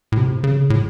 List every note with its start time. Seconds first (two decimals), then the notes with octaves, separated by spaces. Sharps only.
0.12 A2
0.17 C3
0.44 C#3
0.70 A2